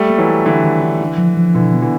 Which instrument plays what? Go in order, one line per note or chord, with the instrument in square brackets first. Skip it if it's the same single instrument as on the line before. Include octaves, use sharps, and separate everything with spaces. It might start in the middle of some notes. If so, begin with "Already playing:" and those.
Already playing: [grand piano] G3 A3
[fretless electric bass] A#3
[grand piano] E3 F#3
[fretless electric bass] A#3
[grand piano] D3 E3 [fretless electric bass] D4
[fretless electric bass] D#3
D4
D4
F3
F3
[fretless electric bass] B2 [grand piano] D3 E3
[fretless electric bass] B3
[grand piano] D3 E3